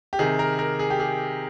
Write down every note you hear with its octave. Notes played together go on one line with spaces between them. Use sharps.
G4
C3 D#3 G#4
A#4
A#4
G#4
G4
G#4